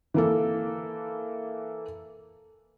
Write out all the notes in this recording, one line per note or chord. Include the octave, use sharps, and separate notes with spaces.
E3 A#3 A4